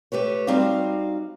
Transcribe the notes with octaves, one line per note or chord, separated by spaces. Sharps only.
A3 G4 B4 C#5
G3 C4 D#4 F#4 F5